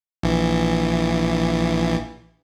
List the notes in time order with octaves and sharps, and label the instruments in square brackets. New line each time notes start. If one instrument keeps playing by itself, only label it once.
[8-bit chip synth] A#1 E3